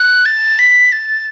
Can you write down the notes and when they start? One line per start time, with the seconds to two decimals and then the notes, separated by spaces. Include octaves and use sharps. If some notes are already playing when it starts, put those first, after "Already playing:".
Already playing: F#6
0.26 A6
0.59 B6
0.92 A6